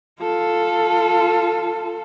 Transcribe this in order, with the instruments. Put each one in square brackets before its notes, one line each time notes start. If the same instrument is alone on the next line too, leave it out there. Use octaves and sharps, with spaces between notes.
[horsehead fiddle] F4 A4